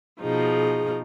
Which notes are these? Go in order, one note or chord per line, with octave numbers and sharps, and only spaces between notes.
B2 F3 D#4 G#4